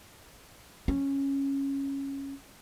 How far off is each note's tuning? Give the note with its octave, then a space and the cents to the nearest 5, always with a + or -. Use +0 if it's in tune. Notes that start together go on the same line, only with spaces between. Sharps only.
C#4 -10